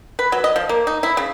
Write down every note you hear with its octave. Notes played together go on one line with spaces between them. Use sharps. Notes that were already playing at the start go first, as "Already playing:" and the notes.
B4
F#3
D#5
F3
A#3
D#4
E4
C#3